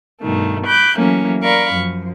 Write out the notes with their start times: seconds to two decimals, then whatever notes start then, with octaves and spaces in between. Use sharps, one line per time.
0.21 G2 B2 D#3 A3
0.67 B5 D6 F#6 G6
0.99 E3 F#3 A3 A#3 C#4
1.43 A#4 D5 F5 B5 C#6
1.74 F#2 F3